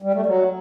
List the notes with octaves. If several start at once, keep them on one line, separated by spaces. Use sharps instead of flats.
G3
A3
F#3